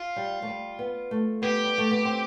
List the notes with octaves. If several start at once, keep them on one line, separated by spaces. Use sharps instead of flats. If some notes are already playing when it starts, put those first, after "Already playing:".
Already playing: F4
G3
A3
G3
B3
A3
B3 G4
G3
A3
B3
C4